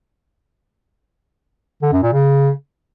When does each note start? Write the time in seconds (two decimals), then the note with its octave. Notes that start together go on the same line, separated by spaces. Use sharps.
1.83 D3
1.93 F#2
2.03 A#2
2.13 C#3